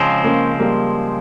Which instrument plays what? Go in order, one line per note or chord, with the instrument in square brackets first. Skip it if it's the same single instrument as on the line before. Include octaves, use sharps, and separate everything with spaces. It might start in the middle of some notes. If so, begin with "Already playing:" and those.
Already playing: [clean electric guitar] C#3 F3 G#3 C4
[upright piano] A#3 C#4
G3 A#3